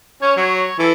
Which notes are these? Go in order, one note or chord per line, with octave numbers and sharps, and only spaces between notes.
C#4 C#5
F#3 C#5
E3 A4